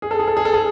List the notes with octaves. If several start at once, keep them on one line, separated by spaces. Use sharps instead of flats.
G#4
A4
G#4
A4
G#4
A4
G#4